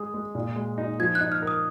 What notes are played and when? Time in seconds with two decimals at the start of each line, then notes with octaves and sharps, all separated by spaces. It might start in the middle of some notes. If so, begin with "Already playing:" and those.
Already playing: G#3 G#4 D#6
0.14 G#3
0.35 A#2
0.56 G#3
0.78 D#4
0.99 F3 G#6
1.15 F#6
1.21 D#4
1.32 F6
1.42 A#4
1.47 D#6